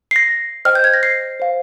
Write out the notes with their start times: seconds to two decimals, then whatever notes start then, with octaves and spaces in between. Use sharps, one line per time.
0.11 C7
0.16 A#6
0.65 C5 D#5 G5 F6
0.75 G6
0.84 G#6
0.94 A#6
1.03 C7
1.40 C5 F5